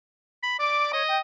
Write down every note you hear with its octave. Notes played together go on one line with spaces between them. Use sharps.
B5
D5 D6
C#5 D#5
G5